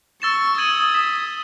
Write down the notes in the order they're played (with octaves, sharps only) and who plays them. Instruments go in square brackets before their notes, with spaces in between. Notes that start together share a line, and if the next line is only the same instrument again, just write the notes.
[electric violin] C#6 [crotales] E6 A6 E7
[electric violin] D#6 [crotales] G#6 D#7 F#7
[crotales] G#6 B6 E7